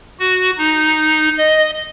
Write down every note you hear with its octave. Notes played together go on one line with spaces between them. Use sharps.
F#4
D#4
D#5